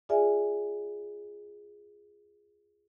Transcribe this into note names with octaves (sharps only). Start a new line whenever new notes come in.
F4 G#4 D5 E5 G#5